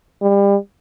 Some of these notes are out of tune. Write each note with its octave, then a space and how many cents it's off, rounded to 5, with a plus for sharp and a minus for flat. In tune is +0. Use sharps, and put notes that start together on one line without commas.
G3 +30